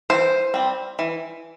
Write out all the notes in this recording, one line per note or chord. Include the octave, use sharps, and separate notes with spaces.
E3 C5
G3 C4
E3